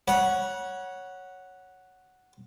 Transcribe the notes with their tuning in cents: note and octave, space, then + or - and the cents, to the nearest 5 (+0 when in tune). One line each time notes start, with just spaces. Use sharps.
C#5 +0 F#5 +0 B5 -40